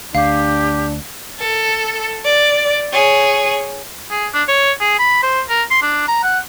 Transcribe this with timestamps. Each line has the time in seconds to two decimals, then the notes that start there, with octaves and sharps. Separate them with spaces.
0.15 D2 D4 G4 F5 C7
1.40 A4
2.24 D5
2.93 G#4 C#5
4.11 G#4
4.34 D4
4.48 C#5
4.80 G#4
4.99 B5
5.23 C5
5.50 A#4
5.71 C6
5.83 D4
6.08 A#5
6.24 F#5